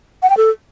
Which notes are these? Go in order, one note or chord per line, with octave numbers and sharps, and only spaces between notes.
F#5
G5
A4